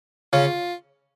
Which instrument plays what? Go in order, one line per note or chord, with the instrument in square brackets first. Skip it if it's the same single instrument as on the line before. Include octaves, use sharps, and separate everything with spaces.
[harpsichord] C#3 C#4 [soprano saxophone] F4